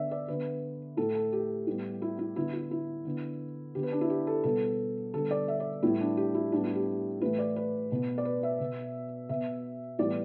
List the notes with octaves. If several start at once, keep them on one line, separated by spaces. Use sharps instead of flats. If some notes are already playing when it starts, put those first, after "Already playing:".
Already playing: D3 B3 D5 E5
D5
D3 B3 B4
A2 A3 A4
A4
G4
A2 G3 B3
E4
E4
D3 B3 E4
E4
E4
D3 B3
D3 B3 G4
B4
D4
E4
G4
A4
B2 G3 B3 A4
D3 G3 B3 A4
D5
E5
D5
A2 G3 B3 E4
D4
G4
E4
A2 G3 B3 D4
E4
G4
A2 E3 A3 B4
D5
B4
B2 B3
D5
B4
E5
B2 B3
B2 B3 E5
A2 E3 G3 B3 D5